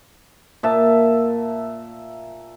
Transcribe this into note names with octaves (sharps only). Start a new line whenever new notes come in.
A#2 E5 A5